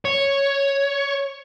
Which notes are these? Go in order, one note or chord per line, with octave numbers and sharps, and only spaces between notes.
C#5